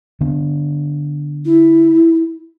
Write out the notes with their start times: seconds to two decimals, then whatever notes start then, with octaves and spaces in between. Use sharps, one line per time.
0.21 D3 B3 D4
1.45 E4